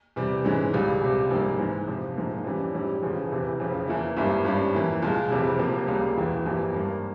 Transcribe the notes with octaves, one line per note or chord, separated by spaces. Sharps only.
E2 C3 G3
G#2 E3 G#3 C#4
C#2 C#3 G3
C#2 C3 G3
A#1 G#2 G3 A#3
G#2 E3 G#3
F2 C3 F3
A#1 G#2 F3 A#3
F2 E3 G3 C#4
A#1 G#2 G3 C#4
E1 E2 C#3 F3
F1 E2 C3 E3
F1 F2 C#3 F3
E2 E3 A#3 E4
G#1 G2 G3 A#3 E4
G#1 G2 G3 C#4
F2 E3 A#3 E4
C2 A#2 G#3
F1 F2 C3 E3 G#3
F1 F2 C3 F3 A#3
C#2 C#3 G3 A#3
E1 E2 E3 G#3
G1 F2 E3 G3 A#3
G#1 G2 G3 A#3